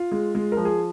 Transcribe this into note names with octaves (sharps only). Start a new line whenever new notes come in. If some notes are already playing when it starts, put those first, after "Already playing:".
Already playing: F4
G#3
G#3
F3 A#4
G#4